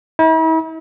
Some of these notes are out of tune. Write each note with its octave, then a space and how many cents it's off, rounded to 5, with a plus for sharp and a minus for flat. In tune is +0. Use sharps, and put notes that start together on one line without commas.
E4 -45